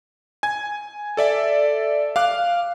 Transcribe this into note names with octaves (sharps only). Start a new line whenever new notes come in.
G#5 G#6
A4 D5 E5
F5 D6 F#6